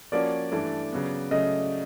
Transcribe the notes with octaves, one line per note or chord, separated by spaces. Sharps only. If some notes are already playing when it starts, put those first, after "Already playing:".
F3 A#3 C#4 F#4 D5
G2 E3 A3 D4
C#3 F#3 B3
C#3 F#3 A3 D#5